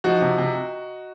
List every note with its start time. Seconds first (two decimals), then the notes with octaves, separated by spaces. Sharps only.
0.04 F3 D#4 F#4
0.21 C3
0.38 C3